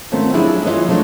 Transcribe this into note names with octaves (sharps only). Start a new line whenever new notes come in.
D#3 A3 C4 C#4 F4 F#4
F3 F#3 D4 E4 G4 G#4
E3 F4 B4 C#5 D#5
F3 F#3 G#3 A3 D4